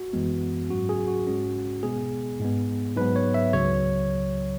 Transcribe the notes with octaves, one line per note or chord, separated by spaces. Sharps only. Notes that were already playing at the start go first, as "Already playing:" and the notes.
Already playing: F#4
F#2 E3 G#3 B3
G#2 F#3 C#4 F#4
G#4
F#4
G#2 G#3 C#4
B2 G#3 B3 G#4
G#2 G#3 B3
G#2 F#3 B3 B4
C#5
E5
C#2 C#3 F#3 C#5